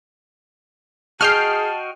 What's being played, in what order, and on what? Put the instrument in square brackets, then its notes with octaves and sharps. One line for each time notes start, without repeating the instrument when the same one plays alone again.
[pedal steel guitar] F#4 D#5 G5 [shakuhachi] G#4 [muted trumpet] A5 [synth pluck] F6 G6 C7